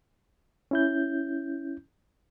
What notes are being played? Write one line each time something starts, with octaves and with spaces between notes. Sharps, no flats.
C#4 E4 G6